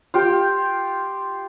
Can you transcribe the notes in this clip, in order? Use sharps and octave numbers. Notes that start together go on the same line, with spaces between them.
F4 G4 G5